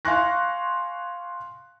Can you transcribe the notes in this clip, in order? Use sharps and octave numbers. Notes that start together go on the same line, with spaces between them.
F5 G#5 C6 C#6 F#6 A#6